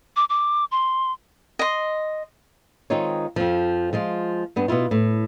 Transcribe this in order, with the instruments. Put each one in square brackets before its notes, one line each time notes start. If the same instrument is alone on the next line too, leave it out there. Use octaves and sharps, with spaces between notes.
[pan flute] D6
D6
C6
[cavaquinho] D#5 C6
[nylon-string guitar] D#3 G#3 C4 D#4 F4 C#5
F2 F3
F3 G#3 F4
G2 B3 D4
B2 B3 E4 F4
A2